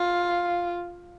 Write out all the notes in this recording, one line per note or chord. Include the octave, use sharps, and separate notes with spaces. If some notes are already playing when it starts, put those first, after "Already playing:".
Already playing: F4